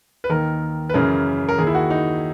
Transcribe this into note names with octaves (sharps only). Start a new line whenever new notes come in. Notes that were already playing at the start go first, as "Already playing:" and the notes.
B4
D#2 D#3 A#4
B4
F#2 C#3 E3 A#4
A#4
D#2 D#3 G#4
E4
F#4
D#4